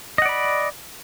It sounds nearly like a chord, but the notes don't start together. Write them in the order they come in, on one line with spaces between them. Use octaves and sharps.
D#5 F#5 D5 B5